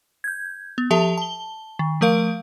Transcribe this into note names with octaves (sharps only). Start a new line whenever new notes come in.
G6 G#6
B3
F3 G4 A4 E5 A5 F7
A5 G7
D#3
F3 A3 A#4 F5 D7